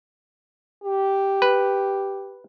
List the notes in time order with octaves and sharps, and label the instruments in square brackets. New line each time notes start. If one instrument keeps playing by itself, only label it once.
[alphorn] G4
[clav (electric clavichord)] B4